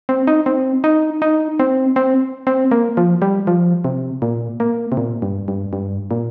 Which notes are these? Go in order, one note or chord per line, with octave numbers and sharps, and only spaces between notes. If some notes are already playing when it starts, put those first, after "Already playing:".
C4
D#4
C4
D#4
D#4
C4
C4
C4
A#3
F3
G3
F3
C3
A#2
A#3
C3
A#2
G2
G2
G2
A#2